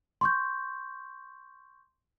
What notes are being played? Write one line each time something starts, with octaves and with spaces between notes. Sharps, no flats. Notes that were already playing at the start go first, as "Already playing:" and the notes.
C6 C#6 G6